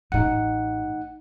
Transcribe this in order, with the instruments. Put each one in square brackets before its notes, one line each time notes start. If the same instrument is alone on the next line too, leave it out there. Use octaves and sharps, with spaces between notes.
[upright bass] A1 A2 [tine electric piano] D#4 F#5